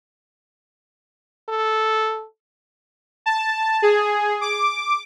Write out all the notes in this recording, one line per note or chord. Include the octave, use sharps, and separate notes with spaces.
A4
A5
G#4
D6